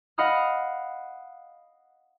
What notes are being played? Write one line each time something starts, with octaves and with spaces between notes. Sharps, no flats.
D#5 F5 F#5 B5 D#6 F6